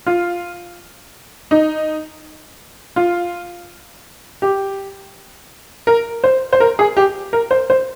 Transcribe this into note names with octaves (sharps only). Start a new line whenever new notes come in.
F4
D#4
F4
G4
A#4
C5
C5
A#4
G#4
G4
A#4
C5
C5